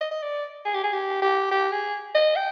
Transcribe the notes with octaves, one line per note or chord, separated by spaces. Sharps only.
D#5
D#5
D5
G#4
G4
G#4
G4
G4
G4
G#4
D#5
G5